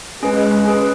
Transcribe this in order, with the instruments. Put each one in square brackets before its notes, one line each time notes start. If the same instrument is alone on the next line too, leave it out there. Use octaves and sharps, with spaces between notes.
[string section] G#3 [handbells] C#4 G#4 B4
[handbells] C#4 G#4 B4